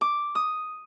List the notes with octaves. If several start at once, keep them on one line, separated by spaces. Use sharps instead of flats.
D6
D#6